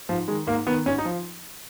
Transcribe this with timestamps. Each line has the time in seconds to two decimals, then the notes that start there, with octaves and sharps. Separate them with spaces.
0.09 G#2 F3
0.28 D#3 G#3
0.47 G#2 A#3
0.67 D#3 B3
0.86 G#2 C#4
0.98 D#4
1.05 F3